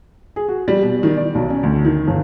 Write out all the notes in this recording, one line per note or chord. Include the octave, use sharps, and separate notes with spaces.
G#4
F#4
G3
B2
D#3
D5
B1
C#4
D2
D#3
G1